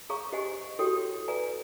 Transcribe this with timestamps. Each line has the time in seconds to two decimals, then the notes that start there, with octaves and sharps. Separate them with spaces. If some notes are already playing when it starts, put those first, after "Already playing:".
0.10 G#4 C#5 F5 A#5 C#6
0.33 G4 C5 D#5 F#5 G#5
0.79 E4 F#4 G4 A4 C#5 G5
1.28 B4 D5 F5 G#5 A#5